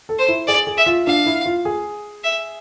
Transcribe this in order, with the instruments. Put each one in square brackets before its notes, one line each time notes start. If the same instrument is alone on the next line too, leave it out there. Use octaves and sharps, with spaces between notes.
[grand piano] A4
[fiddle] C5
[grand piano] E4
[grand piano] G#4 [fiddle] D5
[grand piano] G#4
[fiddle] E5
[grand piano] F4
[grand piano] D4 [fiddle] F5
[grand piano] E4
F4
G#4
[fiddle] E5